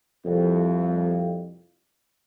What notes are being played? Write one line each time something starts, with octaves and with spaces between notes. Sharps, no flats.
C2 F2